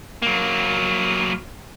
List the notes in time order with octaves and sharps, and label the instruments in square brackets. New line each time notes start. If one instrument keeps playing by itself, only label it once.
[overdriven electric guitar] F#3 A#3